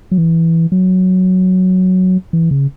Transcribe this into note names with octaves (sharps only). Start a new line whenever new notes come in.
F#3
E3
F#3
E3
C#3